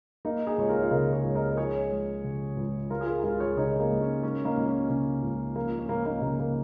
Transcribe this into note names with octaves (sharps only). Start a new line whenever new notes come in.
A#3 D#4
D#4 G#4
C#2 C#5
F4 A#4
F5
C#3 A#4 D#5
G#4 C#5
C#2
A#4 D#5
A#4
F3 G#4 C#5
G#3
C#3
C#2
G#3 F4 A#4
G#4
F4 A#4
C#2 F4 A#4
G#4 C#5
C#3 D#4 G#4
A#3 D#4
C#2
C#4
G#3 C#4
A#3 D#4
C#2
C#4
C#3 C#4
C#2
F3 A#3
C#4
C#2 A#3
A#3 D#4
C#3 A#3
A#3